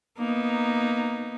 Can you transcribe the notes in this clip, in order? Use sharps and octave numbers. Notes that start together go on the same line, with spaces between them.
A#3 B3 D#4